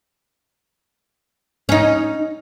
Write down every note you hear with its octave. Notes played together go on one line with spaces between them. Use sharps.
C#4 D#4